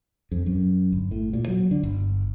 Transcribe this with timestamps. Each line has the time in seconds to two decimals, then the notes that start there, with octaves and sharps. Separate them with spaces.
0.32 F2
0.46 F#2
0.92 G1
1.11 A2
1.33 A#2
1.48 F#3
1.71 D3
1.83 G1